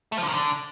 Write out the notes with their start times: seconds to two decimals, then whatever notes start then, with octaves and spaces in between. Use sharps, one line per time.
0.12 A3
0.17 F3
0.23 D3
0.28 D#3
0.34 D3